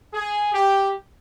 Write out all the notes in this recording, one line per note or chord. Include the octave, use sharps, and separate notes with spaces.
G#4
G4